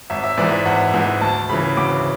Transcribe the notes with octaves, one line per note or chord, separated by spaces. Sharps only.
G#1 E5
E5
G#2 E3 D5
E5
G#1 F#5
G#2 E3
D2 A5
C#3 E3 B5
D2 D6